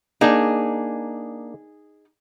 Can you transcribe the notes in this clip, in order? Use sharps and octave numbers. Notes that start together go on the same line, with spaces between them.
A#3 D4 D#4 G#4